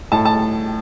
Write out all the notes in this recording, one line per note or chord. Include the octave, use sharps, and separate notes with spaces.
A2 A5
A5